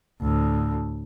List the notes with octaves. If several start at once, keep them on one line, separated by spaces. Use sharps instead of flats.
D2 A2